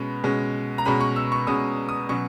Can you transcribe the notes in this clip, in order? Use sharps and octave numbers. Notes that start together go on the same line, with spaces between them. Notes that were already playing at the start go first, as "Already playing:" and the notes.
Already playing: B2 G#3 C#4 B5
B2 G#3 C#4
A#5
B2 G#3 C#4 B5
C#6
E6
C#6
B2 G#3 C#4 D#6
D#6
B2 F#3 C#4 C#6